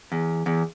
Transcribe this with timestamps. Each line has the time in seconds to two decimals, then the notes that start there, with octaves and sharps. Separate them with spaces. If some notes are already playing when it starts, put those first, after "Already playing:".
0.12 E2
0.46 E2